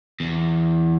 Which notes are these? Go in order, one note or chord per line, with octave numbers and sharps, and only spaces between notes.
E2